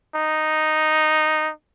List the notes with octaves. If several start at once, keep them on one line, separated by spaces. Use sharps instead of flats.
D#4